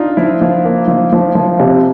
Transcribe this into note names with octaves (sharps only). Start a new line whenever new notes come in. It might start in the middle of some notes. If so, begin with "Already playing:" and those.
Already playing: D4 D#4 F4
F3 E4
F3
A#3
F3
F3
F3
C3